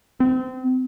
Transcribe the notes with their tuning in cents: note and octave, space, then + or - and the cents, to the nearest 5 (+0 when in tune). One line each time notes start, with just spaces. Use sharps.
C4 -30